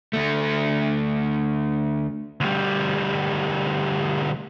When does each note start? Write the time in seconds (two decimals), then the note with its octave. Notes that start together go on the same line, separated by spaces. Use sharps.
0.13 D2 A3
2.41 D2 G3